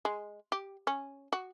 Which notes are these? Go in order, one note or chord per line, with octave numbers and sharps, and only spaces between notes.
G#3
G4
C#4
F#4